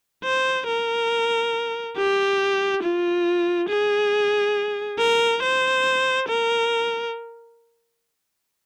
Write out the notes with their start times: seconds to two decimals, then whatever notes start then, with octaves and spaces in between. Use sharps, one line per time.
0.24 C5
0.67 A#4
1.97 G4
2.83 F4
3.69 G#4
4.99 A#4
5.42 C5
6.28 A#4